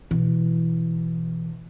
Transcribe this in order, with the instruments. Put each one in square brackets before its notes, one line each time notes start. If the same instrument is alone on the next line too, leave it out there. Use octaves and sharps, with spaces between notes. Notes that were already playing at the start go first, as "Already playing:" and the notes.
[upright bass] B2 E3